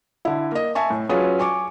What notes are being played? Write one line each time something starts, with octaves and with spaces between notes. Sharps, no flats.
D3 E4
A#3 D#5
E5 G#5 A5 C#6
A2
F#3 C#4 F4 G#4 B4
G#5 C#6 D6